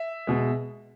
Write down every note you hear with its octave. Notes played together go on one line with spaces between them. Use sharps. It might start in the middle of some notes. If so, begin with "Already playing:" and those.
Already playing: E5
B2 G#3